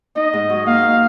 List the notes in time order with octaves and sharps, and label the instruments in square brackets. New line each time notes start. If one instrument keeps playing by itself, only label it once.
[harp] D#4 [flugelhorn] D#5
[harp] G#2
F#3
[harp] A#3 [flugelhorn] F5
[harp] D#4